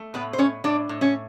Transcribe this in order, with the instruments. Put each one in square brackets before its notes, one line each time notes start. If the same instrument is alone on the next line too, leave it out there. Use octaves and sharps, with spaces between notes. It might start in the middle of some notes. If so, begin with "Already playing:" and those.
Already playing: [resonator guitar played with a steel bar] A3
A2 B3 B4
C5
A2 C#4 C#5
A2 D4 D5
A2
C#4 C#5